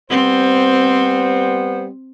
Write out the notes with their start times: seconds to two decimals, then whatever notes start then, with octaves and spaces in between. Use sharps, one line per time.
0.10 G3 B3 C4 C5